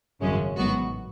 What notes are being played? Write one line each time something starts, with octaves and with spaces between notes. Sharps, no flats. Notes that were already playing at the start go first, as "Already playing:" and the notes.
G#1 F#2 C#3 G#3 C#4
A1 G#2 F#3 B3 F#4